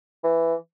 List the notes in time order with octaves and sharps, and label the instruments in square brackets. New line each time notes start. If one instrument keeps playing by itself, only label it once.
[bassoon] E3